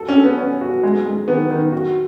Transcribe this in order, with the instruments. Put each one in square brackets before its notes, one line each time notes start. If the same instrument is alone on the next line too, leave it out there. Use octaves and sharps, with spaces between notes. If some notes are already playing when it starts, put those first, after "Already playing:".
Already playing: [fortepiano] F#4 A4
[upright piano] C#4
[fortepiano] A4
[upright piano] B3
[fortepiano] C#4
F#4
G#3
G#3
[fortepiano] D#3 [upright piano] B3
[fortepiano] D#3
F#4